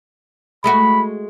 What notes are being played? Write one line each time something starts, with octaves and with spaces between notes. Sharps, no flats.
G#3 A3 F#4 B5